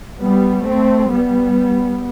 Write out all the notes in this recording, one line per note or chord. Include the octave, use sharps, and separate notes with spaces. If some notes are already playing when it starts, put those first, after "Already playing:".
G3 B3
A3 C4
G3 B3